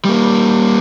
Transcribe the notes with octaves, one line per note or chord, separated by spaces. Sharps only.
G3 A#3